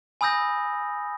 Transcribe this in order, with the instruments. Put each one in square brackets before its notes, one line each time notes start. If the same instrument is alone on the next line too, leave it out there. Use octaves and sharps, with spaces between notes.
[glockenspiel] G#5 B5 D#6 E6 G6 A#6